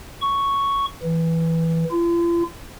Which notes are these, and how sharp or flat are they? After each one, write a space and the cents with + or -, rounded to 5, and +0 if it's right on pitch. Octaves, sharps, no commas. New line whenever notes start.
C#6 +0
E3 -5
F4 -45